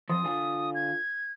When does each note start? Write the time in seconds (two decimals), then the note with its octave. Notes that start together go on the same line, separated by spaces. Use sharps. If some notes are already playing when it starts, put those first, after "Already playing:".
0.09 F2 F3 C5 D#6
0.24 D3 F4 G#5
0.75 G#6